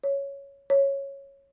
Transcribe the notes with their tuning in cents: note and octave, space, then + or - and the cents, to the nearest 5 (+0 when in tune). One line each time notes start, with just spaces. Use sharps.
C#5 +0
C#5 -10